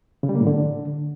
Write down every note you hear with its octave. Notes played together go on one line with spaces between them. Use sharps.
C#3
G3
A#3
A2
D3